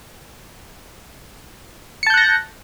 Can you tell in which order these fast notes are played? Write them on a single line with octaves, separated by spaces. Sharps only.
C#7 A5 G6 F#6 A#6